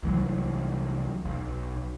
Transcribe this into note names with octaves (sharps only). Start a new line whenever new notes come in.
C2 E3 F#3
B1